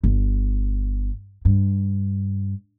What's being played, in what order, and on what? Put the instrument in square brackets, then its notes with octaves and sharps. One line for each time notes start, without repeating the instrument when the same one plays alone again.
[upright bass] G1
G2